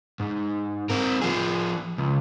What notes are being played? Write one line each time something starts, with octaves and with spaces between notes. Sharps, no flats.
G#2
C4 A#4
F3 G#4
C#2